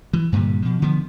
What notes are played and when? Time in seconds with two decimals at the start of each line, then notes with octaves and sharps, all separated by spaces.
0.13 E3
0.32 G2 A#2 D3 G3
0.62 B2 F3
0.82 D3 F3 B3